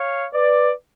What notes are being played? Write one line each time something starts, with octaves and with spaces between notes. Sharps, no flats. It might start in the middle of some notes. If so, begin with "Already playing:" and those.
Already playing: C#5 F5
B4 D5